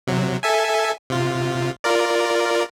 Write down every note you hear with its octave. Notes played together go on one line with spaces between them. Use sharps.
C3 F#3
A4 E5 G#5
C3 F4
F4 A#4 D5